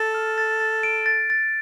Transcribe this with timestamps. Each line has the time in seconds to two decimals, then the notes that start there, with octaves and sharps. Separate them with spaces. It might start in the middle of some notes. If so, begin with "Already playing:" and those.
Already playing: A4 A6
0.15 F6
0.38 A6
0.60 A6
0.83 D7
1.06 A6
1.30 A6